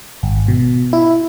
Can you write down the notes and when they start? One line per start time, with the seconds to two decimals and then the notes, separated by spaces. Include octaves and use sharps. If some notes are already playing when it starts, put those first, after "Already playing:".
0.23 G#1
0.48 B2
0.93 E4